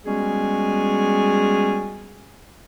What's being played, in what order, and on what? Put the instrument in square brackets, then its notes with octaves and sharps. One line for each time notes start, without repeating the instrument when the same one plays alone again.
[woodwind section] G3 G#3 B3 C#4 F#4 G#4